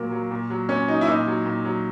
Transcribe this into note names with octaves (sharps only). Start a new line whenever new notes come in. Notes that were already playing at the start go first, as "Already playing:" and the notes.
Already playing: A#2 F#3 A#3
F#3
A#2
F#3
A#2 C#4
F#3 D#4
E4
A#2 D#4
F#3
A#2
F#3